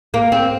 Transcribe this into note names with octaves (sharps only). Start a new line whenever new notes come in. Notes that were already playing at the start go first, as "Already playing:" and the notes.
A#3
C4